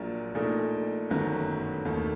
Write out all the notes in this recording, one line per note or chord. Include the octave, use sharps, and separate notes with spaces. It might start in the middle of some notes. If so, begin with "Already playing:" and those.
Already playing: A#1 A#2 F#3
A#1 A#2 A3 D#4
G1 F#2 D#3 F#3 A3
D#2 D#3 A3